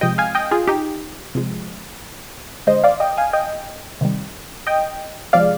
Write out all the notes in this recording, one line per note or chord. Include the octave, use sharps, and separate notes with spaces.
C3 F3 G#3 D#5 G5
F5 G#5
D#5 G5
F4 G#4
D#4 G4
C3 F3 G#3
D3 G#3 C5 D#5
D5 F5
D#5 G5
F5 G#5
D#5 G5
C3 D#3 G3
D#5 G5
C3 F3 G#3 D5 F5